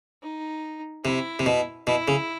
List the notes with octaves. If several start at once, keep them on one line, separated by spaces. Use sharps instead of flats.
D#4
C3 E4
C3
B2
B2 E4
C#3